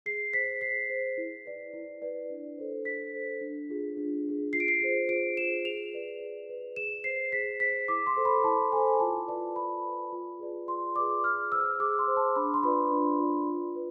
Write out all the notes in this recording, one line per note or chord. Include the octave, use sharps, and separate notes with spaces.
G#4 C7
C5 B6
G#4 C7
C5
E4
B4 D5
E4
B4 D5
D4
A4 C5
D4 B6
A4 C5
D4
F4 G#4
D4
F4 G#4
F4 C7
D7
C7
G#4 C5
F4 D7
G#4 C5 E7
G#4 F7
B4 D5
G#4
B4 D5
G#4 E7
C5 C7
G#4 B6
C5 B6
E4 D6
C6
A4 C5
B5
E4 A5
A4 C5 G#5
F4 A5
B4 D5 A5
F4 B5
B4 D5
F4
G#4 B4 D5
F4 C6
G#4 B4 D5 D6
G#4 F6
C5 E6
G#4 D6
C6
C5
A5
D4 B5
C6
F4 B4 D5 B5
D4
F4 B4 D5
F4
B4